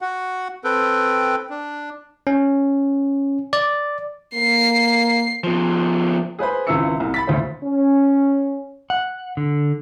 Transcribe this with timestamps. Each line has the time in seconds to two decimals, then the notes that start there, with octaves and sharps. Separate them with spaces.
0.01 F#4 F#5
0.64 C4 A4 B4 G5
1.50 D4
2.27 C#4
3.53 D5
4.35 A#3 C7
5.44 F3 B3
6.39 G#4 B4 C5 B5
6.67 G#1 C#2 E3 E4 E6 C#7
7.00 C2
7.14 B5 A6 B6
7.27 G1 D2 C5
7.64 C#4
8.90 F#5
9.37 D3